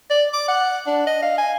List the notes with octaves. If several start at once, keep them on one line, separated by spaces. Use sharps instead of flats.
D5
D6
F#5
D4
D#5
F5
G#5